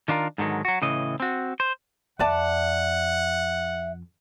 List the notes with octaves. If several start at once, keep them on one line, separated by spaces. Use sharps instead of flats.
D#3 D4 F4 A#4
G#2 D3 D#3 F#3
F#3 F#4
A2 C#3 E3 D#5
C4 F#4
C5
F2 B4 D5 E5 F#5 A5